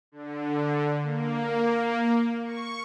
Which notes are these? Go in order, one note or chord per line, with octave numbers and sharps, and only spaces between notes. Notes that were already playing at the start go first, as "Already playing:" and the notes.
D3
A#3
C#6